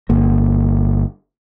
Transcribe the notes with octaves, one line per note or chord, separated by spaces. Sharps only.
G1 A#3